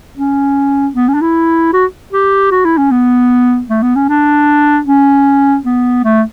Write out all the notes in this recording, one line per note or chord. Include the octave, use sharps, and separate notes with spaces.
C#4
B3
C#4
D4
E4
F#4
G4
F#4
E4
C#4
B3
A3
B3
C#4
D4
C#4
B3
A3